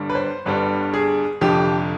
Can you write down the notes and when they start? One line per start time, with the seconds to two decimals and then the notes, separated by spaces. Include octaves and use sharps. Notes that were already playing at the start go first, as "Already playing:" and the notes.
Already playing: G1 G2 D3 G3
0.10 B4
0.15 C5
0.45 G1 G2 D3 G3 B4
0.94 G#4
1.41 F1 F2 D3 F3 G4